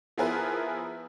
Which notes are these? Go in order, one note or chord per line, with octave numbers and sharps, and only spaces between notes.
F3 B3 E4 G#4 A#4 B4